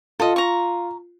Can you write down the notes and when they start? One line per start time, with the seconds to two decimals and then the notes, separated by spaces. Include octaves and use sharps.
0.20 F4 A4 D#5
0.36 A#5 C#6